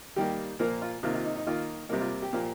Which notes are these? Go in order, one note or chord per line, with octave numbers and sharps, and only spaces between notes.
D#3 G3 A#3 G4
A#2 F3 A#3 A#4
F4
C3 D#3 A#3 F4
F4
D#4
D#4
D#3 A#3 F4
C3 G3 A#3 A#4
F4
G4
A#2 F3 A#3